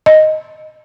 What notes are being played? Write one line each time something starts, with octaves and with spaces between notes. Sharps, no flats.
D#5